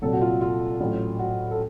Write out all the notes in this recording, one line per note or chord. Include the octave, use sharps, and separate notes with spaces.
C2 A#2 F#3 A4
F#4
F4
F4
A1 A2 F#3
F#4
A4